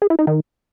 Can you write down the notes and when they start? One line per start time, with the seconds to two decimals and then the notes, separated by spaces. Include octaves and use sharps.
0.02 G#4
0.10 E4
0.19 D#4
0.27 D#3